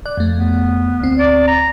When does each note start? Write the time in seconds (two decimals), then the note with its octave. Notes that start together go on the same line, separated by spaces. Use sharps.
0.06 D5 F#6
0.17 F2 A3
0.36 B3
1.00 D2 C4
1.19 D5
1.48 A#5